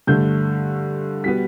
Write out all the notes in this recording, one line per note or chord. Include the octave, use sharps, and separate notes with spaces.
G2 D3 A3 G6
B2 G3 B3 B6